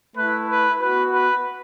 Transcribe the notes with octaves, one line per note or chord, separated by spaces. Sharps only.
A3 E4 B4
B4
B3 F#4 B4
B4